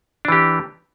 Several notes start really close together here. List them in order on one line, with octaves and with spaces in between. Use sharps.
D4 E3 G4